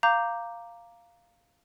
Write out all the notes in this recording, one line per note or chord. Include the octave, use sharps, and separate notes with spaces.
F5 A#5 D6 G6